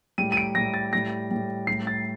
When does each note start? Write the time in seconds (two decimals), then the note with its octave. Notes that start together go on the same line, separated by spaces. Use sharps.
0.18 A2 G3 D#7
0.32 D#7
0.37 D7
0.55 A2 G3 A#6
0.74 A6
0.93 A2 G3 A#6
1.31 A2 G3
1.67 A2 G3 C7
1.87 A6